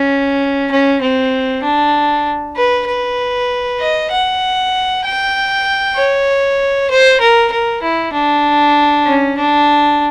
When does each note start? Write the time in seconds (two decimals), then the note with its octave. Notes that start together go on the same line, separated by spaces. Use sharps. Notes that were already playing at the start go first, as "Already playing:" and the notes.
Already playing: C#4
0.71 C#4
1.02 C4
1.63 D4
2.57 B4
2.88 B4
3.80 D#5
4.11 F#5
5.04 G5
5.96 C#5
6.90 C5
7.21 A#4
7.52 A#4
7.82 E4
8.14 D4
9.06 C#4
9.38 D4